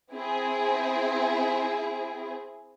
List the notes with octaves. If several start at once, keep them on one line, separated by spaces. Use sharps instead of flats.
C4 E4 G#4